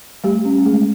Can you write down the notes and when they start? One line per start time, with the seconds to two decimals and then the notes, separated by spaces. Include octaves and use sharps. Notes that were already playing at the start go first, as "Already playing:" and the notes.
0.24 G3 A3 G4
0.45 C#4
0.65 G#3 A3 G#4